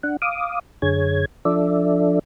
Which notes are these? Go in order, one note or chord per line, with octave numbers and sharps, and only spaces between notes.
D4 F#5
F5 D6 D#6
F#2 D3 G#4 C#5 G#6
F3 D4 A4 D5 E5